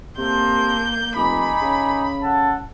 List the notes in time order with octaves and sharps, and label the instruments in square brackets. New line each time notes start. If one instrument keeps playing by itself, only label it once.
[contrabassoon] C3 [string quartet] A#3 G6 [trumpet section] A4 C6
[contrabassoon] F1 [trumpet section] D#4 G#5 D6 [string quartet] B5
[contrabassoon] C#3
[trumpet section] A4 F#5 A5